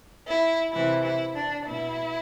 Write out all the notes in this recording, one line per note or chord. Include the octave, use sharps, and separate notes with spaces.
E4
C3 E3 E4
E4
D4
B2 E4